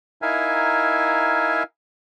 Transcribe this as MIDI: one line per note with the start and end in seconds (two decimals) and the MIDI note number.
0.22 1.63 63
0.22 1.63 64
0.22 1.63 70
0.22 1.63 76
0.22 1.63 77
0.22 1.63 80